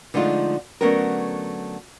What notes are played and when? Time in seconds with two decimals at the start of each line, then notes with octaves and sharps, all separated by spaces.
0.14 D3 F3 G#3 A3 D#4 F4
0.81 D3 F#3 A3 B3 C#4 A#4